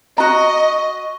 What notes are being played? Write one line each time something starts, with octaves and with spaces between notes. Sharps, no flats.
F#4 D#5 A#5